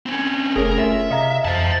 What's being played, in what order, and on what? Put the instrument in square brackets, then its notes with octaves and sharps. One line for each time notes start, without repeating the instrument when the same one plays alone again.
[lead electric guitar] C4 C#4
[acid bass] F1 [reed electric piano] A3 C#4 G#4 [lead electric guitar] A#4
[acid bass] F4 [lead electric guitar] E5
[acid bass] C3 [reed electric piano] D#5 F5 A#5
[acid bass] F2 [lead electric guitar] C5 A5